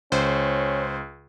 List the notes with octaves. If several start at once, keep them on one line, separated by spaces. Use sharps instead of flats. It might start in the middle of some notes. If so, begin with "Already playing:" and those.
C#2 C#4 C5